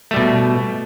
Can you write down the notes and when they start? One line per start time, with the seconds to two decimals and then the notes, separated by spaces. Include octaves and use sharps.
0.11 A3
0.14 G3
0.16 B2